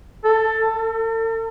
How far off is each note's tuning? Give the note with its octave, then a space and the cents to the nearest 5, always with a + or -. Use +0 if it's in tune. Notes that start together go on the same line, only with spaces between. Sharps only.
A4 +15
A4 +45